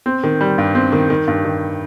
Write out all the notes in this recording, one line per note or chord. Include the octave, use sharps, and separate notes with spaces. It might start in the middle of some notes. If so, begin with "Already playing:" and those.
C4
D#3
G3
G2
C4
D#3
D#3
G2
D#3